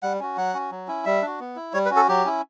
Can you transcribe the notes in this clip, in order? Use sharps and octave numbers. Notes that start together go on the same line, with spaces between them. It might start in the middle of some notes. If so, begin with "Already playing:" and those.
G3 F#5
C#4 F#4
F#3 F#5
C#4 F#4
F#3
C#4 E4
G3 E5
D4 F#4
B3
E4
G3 C#5
B4
C#4 F#4
A4
F#3 G4
C#4 E4